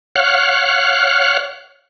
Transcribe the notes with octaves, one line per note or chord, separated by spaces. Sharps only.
C#5 F5 F#5 F6 F#6